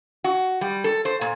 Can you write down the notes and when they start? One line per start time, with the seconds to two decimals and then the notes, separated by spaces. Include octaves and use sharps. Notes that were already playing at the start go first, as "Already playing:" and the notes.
0.24 F#4
0.61 G3
0.84 A4
1.05 C5
1.21 A#2